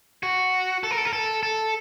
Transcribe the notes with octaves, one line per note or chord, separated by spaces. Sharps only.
F#4
A4
A#4
A4
A#4
A4
A4